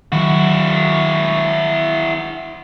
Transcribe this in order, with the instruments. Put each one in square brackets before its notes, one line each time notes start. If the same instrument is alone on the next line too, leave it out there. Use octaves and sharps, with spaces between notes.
[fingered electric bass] D#3 F#3 [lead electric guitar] E4 F#4